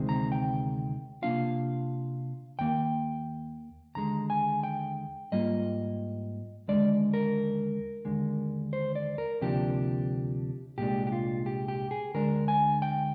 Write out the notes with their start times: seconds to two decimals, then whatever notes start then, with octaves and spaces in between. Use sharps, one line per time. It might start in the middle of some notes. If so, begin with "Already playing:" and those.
Already playing: D2 C3 D#3 G#3 C4
0.09 A#5
0.32 G5
1.22 C3 D#3 A#3 D4 F4 F5
2.59 D#2 D#3 A#3 G5
3.95 D#2 D3 G#3 A#5
4.30 G#5
4.63 G5
5.32 G#2 G3 A#3 F4 D#5
6.68 D#2 D3 G#3 D5
7.14 A#4
8.05 D#2 D3 G#3
8.73 C5
8.96 D5
9.18 A#4
9.41 D2 C3 F3 A#3 D4 G4
10.78 C2 A#2 G#3 D4 G4
11.07 G4
11.12 F4
11.46 G4
11.68 G4
11.91 G#4
12.14 D2 D3 G#3 D4 A#4
12.48 G#5
12.82 G5